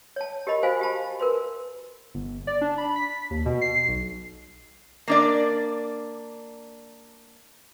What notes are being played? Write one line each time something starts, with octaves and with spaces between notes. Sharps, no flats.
C#5 A5
G4 A#4 D#5 B5
F#4 C5 F5 G#5
G4 C5 A5 B5
A#4 B4 C6
G1
D5
D4
B5
B6
D#2
B2
C7
B1
A#3 D4 D5